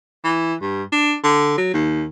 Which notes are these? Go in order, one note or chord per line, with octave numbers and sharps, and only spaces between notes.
E3
G2
D4
D3
F#3
D#2